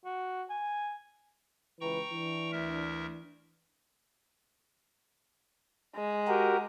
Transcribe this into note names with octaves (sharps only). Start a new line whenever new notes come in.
F#4
G#5
C#2 E3 B4 G5 A#5 C#6
E3 D4
D2 A#4 E5
G#3
F#4 G4 A#4